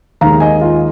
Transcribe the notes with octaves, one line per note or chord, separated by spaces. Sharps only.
D#2 D#3 G#3 F5 A#5
D#5 G#5
F4